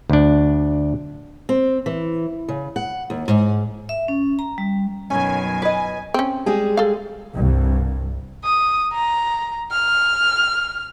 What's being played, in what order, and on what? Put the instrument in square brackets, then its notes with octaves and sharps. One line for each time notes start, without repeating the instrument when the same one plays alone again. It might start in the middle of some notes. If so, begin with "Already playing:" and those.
[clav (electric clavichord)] D2 D4
[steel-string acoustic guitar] C4
E3
C#3
F#5
D#2
G#2
[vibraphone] E5
C#4
A#5
G3
[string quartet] F#2 B2 D#3 [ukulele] C#4 [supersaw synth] G#5
[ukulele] B4 D#5
[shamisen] C4 C#4
[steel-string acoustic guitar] G3 G#3 G#4
[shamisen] A4 F5
[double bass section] C2 G2
[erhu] D#6
A#5
F6